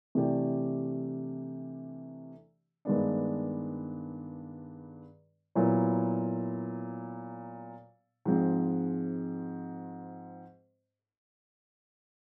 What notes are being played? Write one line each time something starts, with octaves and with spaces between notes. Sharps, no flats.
C3 E3 A3 D4 G4
G2 D#3 G#3 B3 D4
A#2 F#3 B3 E4
G#2 F3 G#3 C4